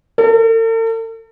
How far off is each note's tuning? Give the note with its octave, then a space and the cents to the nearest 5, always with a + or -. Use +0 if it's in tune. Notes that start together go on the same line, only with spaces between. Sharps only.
A4 +45